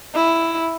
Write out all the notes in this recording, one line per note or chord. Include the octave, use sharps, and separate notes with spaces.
E4